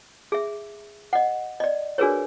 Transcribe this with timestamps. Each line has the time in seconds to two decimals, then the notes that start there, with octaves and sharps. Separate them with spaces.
0.32 G#4 E5
1.13 D#5 F#5
1.60 D5 D#5
1.98 D4 F#4 G#4 A#4 B4 C#5